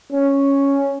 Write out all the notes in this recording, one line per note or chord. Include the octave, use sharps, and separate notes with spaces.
C#4